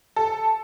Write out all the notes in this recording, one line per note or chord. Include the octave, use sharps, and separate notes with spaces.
A4